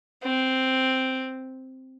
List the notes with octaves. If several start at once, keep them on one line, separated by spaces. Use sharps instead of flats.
C4